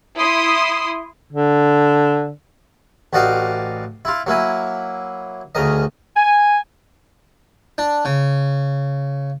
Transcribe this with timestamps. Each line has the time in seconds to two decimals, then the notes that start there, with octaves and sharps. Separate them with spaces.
0.17 E4 C6 D#6
1.33 D3
3.13 A1 F#4 D5 D#5 F5 G5
4.05 E4 F4
4.27 F#3 A#3 E4 G#5
5.55 D2 C#3 A#4 D#5
6.17 G#5
7.78 D4
8.05 C#3